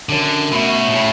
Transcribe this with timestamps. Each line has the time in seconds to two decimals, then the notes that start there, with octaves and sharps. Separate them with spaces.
0.09 F#2 D3
0.52 B2 A3
0.90 B2
0.94 A2 C#3